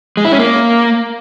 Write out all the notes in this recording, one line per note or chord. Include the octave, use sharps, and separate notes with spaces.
G#3
E4
C#4
A#3